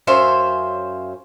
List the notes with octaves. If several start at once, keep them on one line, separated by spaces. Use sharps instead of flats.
F#2 C#4 C5 E5 F5